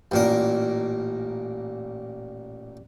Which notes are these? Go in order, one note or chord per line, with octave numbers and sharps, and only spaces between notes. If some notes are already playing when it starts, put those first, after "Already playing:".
A1 A#2 A#4